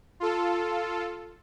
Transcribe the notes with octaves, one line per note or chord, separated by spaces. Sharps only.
F4 A4